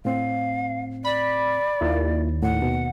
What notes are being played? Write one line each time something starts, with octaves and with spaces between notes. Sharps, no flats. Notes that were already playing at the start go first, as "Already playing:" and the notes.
A2 C4 F5
D5 B5
D#2 E4 F4
A2 F#5
B2